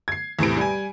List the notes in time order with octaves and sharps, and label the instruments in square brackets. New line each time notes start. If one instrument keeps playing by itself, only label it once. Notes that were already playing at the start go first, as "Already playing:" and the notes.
[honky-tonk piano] G#6 C7
E2 A2 C3 D7
G3 G#5